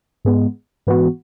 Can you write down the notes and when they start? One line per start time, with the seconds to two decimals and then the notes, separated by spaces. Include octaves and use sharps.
0.25 G#2 G#3 B3
0.87 G#2 E3 B3 F#4